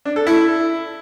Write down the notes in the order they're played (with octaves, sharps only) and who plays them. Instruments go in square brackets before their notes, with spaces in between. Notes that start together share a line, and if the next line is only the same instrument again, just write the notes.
[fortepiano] D4
A4
E4